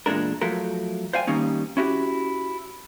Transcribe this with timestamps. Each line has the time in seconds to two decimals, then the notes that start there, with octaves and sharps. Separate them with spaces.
0.06 E2 A#2 D3 G#3 D4 A#4
0.41 F3 F#3 A3 A#4
1.13 C5 D5 F5 G5 G#5
1.27 D#3 G3 A#3 C#4 D#4
1.77 C#4 E4 F#4 G4